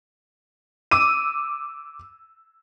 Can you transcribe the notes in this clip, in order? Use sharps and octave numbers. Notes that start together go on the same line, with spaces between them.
D6 E6 D#7